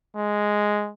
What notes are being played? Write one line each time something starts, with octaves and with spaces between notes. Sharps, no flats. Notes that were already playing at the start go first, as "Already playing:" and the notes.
G#3